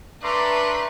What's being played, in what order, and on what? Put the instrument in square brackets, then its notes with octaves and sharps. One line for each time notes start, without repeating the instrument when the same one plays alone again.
[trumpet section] A3 D4 [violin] B4 [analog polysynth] A#5 C6 D6